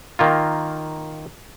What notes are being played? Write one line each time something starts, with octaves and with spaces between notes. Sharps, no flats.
D#3 A#3 F4